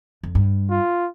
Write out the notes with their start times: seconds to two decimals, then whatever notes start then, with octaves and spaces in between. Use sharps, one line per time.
0.23 F2
0.35 G2
0.70 F4